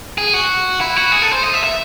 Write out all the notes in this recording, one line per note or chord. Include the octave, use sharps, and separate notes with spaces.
G#4
F#4
E4
F#4
G#4
A4
C5
D#5
E5
E5